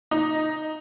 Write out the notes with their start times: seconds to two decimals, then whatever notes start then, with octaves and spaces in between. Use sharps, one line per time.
0.11 D#4